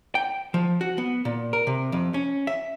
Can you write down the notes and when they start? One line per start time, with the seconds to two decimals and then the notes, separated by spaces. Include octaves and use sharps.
0.15 G5
0.54 F3
0.81 F#4
0.98 B3
1.25 A#2
1.53 A#4
1.67 C3
1.92 F2
2.14 C#4
2.47 E5